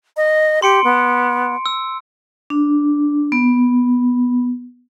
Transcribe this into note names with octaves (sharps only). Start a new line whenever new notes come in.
D#5
G4 C6 C#7 D7
B3
E6
D4
B3